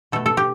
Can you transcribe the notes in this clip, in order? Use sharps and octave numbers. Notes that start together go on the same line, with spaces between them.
B2 A3 A4
A4
G4